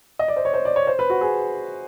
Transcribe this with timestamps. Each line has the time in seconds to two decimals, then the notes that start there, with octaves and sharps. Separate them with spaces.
0.19 D#5
0.28 D5
0.36 C5
0.45 C#5
0.54 C5
0.65 D5
0.76 C#5
0.87 C5
0.99 B4
1.10 F#4
1.21 G#4